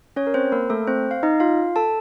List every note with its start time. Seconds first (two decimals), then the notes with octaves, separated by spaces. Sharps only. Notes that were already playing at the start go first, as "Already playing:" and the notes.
0.16 C#4 C#5
0.27 A#4
0.34 C4 C5
0.52 A#3 A#4
0.70 A3 A4
0.87 C4 C5
1.11 F5
1.23 D#4 D#5
1.40 F4 F5
1.76 A4 A5